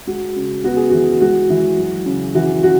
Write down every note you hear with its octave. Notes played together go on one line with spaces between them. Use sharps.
G#3 F#4
C#3
B3 F#4
G#4
E3 F#4
G#3 F#4
E3
F#3
C#3
E3 F#4
C#3 F#4